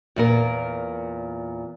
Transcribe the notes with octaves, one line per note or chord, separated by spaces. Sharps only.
E2 A#2 A#4